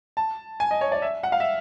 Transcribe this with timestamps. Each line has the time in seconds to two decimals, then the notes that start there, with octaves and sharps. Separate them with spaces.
0.17 A5
0.60 G#5
0.71 D#5
0.81 C#5
0.92 D5
1.02 E5
1.23 F#5
1.32 F5
1.40 E5